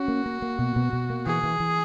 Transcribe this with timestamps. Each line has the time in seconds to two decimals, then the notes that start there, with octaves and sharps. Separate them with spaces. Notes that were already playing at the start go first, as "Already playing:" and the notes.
Already playing: C#4 F#4
0.08 A#3
0.26 A#3
0.42 A#3
0.59 B2
0.76 B2
0.93 B2
1.10 A#3
1.26 E3 G#4
1.44 E3
1.60 E3